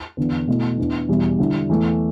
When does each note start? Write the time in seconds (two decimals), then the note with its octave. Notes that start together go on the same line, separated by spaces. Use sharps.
0.17 E2 D3 B3
0.48 B2 A3 E4
0.78 E2 E3 B3 D4
1.09 E2 B2 G3 E4
1.39 D3 G3 E4
1.69 E2 E3 A3